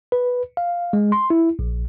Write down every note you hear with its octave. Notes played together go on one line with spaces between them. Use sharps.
B4
F5
G#3
C6
E4
A#1